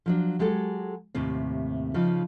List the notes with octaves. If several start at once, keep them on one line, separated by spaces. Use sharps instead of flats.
F3 F#3 D4
F#3 G#3 G4 A4
D#2 A2 C3 C4
C#3 F3 D#4